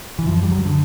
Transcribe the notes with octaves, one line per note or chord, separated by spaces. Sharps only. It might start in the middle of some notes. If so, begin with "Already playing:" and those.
E3
F#2 F3
G3
F#3
D3